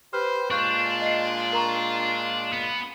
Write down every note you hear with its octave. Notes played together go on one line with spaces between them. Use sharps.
G4 B4 C5 F6
A#2 G#3 D4 F4 C#6 F#6 G6
D#5 C7
A#4 A#5 C#6
B3